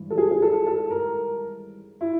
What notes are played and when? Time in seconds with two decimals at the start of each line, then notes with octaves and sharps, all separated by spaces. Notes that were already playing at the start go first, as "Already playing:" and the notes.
Already playing: G#1 G2 E3
0.10 A4
0.18 G#4
0.31 G#4
0.42 A4
0.67 A4
0.91 A#4
2.01 E4